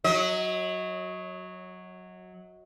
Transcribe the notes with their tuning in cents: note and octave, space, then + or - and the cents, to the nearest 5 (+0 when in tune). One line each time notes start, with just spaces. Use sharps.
F#3 -10 D#5 +35